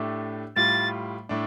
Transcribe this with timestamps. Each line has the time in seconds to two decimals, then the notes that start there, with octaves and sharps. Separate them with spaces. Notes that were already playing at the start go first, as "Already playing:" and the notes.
Already playing: A2 A3 D4 G4
0.56 A2 G3 F4 A6
1.29 A2 A3 D4